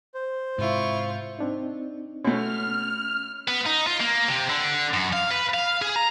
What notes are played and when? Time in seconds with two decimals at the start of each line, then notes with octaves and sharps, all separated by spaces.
0.14 C5
0.58 G#2 C3 E4 F4 C#6
1.39 C4 D4 D#4
2.25 B2 A3 C#4 F6
3.48 B3
3.66 D#4
3.87 F4
4.00 A#3
4.28 C3
4.49 D3
4.94 F#2
5.13 F5
5.30 B4
5.54 F5
5.82 G#4
5.96 A#5